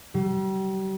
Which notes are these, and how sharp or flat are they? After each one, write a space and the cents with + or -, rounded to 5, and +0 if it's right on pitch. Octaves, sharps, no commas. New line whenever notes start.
G3 -40